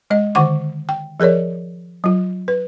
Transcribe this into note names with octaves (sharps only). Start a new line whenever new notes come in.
G#3 D#5
D3 D#3 C5 F#5 C#6 D6
G5
F3 G#4 A#4 C#5 D5
F#3 F4
B4